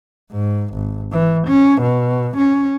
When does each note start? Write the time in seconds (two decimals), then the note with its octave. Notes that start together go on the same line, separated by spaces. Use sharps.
0.32 G#2
0.75 G#1
1.12 E3
1.48 C#4
1.82 B2
2.37 C#4